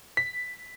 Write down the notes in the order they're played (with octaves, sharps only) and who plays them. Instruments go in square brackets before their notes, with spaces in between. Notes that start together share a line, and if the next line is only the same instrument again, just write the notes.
[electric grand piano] B6